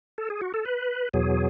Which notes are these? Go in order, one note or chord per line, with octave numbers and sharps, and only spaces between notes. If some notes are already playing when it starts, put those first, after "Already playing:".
A4
G#4
F#4
A4
B4
E2 B2 F#3 G#4